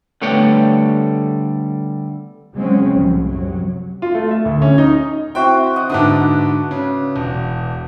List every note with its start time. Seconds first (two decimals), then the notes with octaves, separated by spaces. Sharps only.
0.22 D3 G3 A3 B3 C#5 G5
2.56 C#3 F#3 G#3 C4 C#4
2.95 C2 A2 F3 F#3
3.26 C2 F#2 C3 F#3
4.02 F4
4.14 A3
4.31 E5
4.45 D2
4.62 C#4
4.78 D#4
5.35 C4 E4 F#4 C5 G5
5.76 D#5 F#5
5.90 G#2 D3 D4 B4 D#6
6.71 C#3
7.16 E1